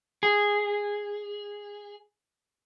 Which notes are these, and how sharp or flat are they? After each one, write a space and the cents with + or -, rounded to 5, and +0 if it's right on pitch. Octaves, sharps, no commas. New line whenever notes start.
G#4 -10